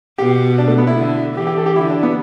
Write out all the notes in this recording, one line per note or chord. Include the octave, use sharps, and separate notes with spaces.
B2 G4
D4
A3
B3
E4
D3
E3 G4
G4
A4
G4
D3 E4
D4
B3